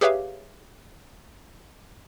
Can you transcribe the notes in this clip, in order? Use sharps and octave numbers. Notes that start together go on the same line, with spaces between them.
G4 G#4 B4 C#5 E5 F5